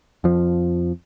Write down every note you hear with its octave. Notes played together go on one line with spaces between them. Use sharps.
F2 F3